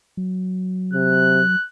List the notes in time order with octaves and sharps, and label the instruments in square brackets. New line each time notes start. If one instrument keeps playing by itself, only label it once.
[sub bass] F#3
[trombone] C3 [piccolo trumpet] F#6